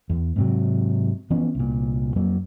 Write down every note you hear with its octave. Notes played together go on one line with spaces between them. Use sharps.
E2
G#2 C3 F#3
E3 F3 B3 C#4
C2 A#2
F2 F#3 A#3